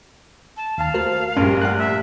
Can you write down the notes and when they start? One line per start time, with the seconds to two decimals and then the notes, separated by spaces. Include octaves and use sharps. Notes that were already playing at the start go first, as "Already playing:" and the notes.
0.57 A5
0.78 D#2 F5 A5
0.94 A3 F#4 A#4 C5
1.37 A#1 G2 G3 C#4
1.62 A3 F5 F#5 F#6
1.78 E5